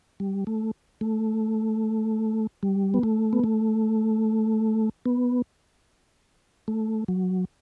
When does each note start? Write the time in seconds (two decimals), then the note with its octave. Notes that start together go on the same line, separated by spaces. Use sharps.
0.20 G3
0.47 A3
1.01 A3
2.63 G3
2.94 B3
3.03 A3
3.33 B3
3.44 A3
5.06 B3
6.68 A3
7.08 F#3